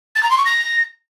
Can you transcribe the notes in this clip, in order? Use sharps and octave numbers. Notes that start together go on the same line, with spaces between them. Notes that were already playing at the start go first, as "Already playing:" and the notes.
A6
A#5
C6
C#6
A#6